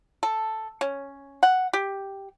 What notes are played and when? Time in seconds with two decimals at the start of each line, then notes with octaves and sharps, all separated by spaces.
0.23 A4
0.81 C#4
1.43 F#5
1.73 G4